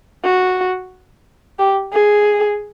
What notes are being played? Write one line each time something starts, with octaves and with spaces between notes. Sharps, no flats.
F#4
G4
G#4